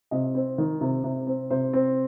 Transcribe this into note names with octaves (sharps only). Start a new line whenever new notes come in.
C3 D#5
C4
D#3
C3
C3
C4
C3 C5
C4